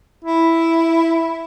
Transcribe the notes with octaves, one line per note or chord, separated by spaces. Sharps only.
E4